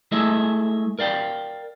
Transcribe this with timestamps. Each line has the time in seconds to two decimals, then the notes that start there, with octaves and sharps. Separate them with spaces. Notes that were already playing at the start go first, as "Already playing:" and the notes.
0.11 G#3 A3 E4 G#4 D#5 E5
0.99 A#4 D5 F5 G5